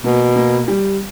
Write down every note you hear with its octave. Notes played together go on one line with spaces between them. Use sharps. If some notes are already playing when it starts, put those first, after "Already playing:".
B2 A#3
A#3
G3